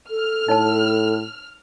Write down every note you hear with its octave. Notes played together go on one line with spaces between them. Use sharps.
A4 F6
A2 D#4 C#5 A5